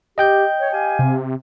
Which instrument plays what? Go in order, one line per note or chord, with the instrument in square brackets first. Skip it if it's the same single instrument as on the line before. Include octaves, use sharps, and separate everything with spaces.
[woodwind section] G4 [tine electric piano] D#5 G5 G6
[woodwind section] C#5
G4 F5 G#5
[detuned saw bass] C3